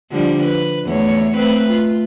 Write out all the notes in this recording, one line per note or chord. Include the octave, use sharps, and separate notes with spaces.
D3 F3 G3
B4
E2 A3 C#5
A3 C4 B4
F4